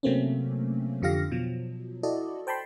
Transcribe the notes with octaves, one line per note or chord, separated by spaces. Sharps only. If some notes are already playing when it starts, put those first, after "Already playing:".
C3 F#3 A3 A#3 C4 C#4
F2 D3 F4 G4 F5 A#6
B2 F3 F#3
E4 F#4 A4 D5 D#5
C5 G5 A5 B5 C6